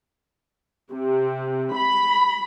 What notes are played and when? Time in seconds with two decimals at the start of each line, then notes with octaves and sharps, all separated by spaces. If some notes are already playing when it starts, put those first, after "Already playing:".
0.90 C3
1.74 B5